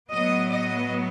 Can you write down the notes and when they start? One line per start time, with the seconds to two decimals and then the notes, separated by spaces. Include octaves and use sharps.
0.11 A2 F#3 B3 D#5
0.50 D#5